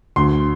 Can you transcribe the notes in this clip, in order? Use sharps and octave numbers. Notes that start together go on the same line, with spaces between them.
D2 C6